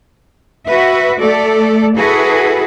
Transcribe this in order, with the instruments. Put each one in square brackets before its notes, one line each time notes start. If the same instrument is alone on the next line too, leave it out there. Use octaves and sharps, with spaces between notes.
[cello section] F#4 B4 E5
A3 A4 D5
E4 F#4 G#4 A4 B4